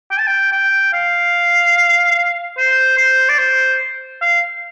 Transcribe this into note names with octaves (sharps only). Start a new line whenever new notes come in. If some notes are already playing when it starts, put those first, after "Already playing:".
G5
A5
G5
G5
F5
C5
C5
D5
C5
F5